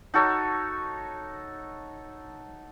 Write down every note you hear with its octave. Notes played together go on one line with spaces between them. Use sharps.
D#4 F#4 A4 C#5